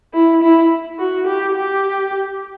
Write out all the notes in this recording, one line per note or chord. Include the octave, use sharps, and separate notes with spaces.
E4
E4
F#4
G4
G4